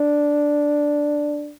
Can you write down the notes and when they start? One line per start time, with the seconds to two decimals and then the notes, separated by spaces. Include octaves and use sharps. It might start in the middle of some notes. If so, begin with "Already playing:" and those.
Already playing: D4